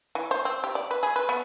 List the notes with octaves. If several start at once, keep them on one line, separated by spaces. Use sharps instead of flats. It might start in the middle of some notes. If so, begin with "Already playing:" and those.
E3
C5
C4
G4
D5
B4
G#4
B4
B3